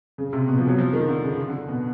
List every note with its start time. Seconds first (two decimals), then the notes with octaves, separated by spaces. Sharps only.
0.18 C#3
0.33 C3
0.48 B2
0.58 F3
0.68 F#3
0.78 F3
0.93 D#3
1.08 D3
1.23 C#3
1.48 D3
1.68 B2